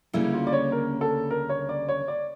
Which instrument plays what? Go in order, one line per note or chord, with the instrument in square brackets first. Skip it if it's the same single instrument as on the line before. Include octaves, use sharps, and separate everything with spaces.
[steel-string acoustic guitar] D2 C#3 G3 A#3 C#4 [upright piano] E4
[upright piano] F4
D5
C#5
A#4
A4
A#4
C#5
D5
C#5
D5